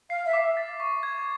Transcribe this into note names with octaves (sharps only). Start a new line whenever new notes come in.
F5 C7
E5
D6
A6
C#6
G#6